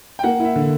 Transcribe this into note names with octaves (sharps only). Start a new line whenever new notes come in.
G5
A#3 F#5
E4
E5
D3